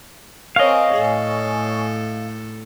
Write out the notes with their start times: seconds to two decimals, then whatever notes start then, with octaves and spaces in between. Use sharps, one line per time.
0.56 C4 A#4 C#5 D#5 F5 G#5 C#6
0.94 A2 A4